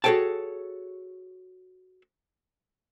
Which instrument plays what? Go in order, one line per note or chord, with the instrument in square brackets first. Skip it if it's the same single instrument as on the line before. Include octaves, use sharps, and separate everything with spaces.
[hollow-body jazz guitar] F#4 G#4 A4 C#5 G5 A5